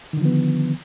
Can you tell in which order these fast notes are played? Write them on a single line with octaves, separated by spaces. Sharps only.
D#3 D3 F3 B3